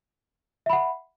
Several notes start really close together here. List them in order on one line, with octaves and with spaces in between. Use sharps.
E5 B5 F#5